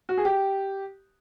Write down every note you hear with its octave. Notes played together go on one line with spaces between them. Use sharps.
F#4
G#4
G4